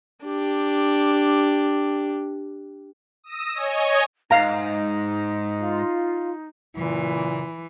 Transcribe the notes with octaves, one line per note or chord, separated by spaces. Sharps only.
D4 G4
D#6 E6 A#6 D#7
C#5 D#5 G#5
G#2 D#4 F5 A#5
F4
A#2 C#3 E3 F#3